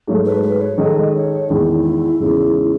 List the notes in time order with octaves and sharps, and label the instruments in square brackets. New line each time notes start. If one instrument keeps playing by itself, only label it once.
[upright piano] G#2 F#3 A3
[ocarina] B4
B4
C#5
[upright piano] D#3 G#3 D#4 A4 [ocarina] D#5
[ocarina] C#5
[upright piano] E2 D#3 G#3 [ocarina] E4
[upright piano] E2 C#3 G#3 D#4